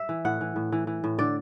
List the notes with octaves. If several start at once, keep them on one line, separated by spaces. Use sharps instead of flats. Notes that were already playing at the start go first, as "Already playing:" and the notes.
Already playing: E5
E3
A2 F#5
E3
A2
E3
E3
A2
D3 D5